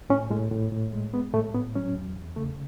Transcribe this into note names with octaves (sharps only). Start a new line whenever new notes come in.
A2 C#4
A2 G#3
A2
A2
G#3
G#3 B3
A2 A3
A2 B3
F#3 C#4
E2
E2
C#3 A3